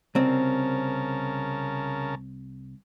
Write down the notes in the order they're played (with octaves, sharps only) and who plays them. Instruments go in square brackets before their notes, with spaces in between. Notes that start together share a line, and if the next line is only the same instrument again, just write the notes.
[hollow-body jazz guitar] C2 C4 [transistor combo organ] C#3 A#4 A5